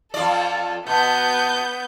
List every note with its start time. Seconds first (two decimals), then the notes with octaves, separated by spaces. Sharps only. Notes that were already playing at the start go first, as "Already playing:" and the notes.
0.14 F2 F4 A4 D5
0.87 B2 B3 G6